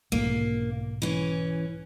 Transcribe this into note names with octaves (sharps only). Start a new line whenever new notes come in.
B1 G#2 F3 A#3
E3 C#4